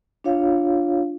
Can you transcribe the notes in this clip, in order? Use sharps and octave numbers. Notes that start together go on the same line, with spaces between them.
D4 F4 C#5 F5